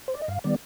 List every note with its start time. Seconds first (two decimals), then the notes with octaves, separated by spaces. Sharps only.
0.08 C5
0.14 D5
0.22 D#5
0.28 G2 F5
0.44 D#3 G3 B3 D5